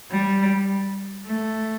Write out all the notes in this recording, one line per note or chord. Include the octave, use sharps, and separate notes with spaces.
G3
A3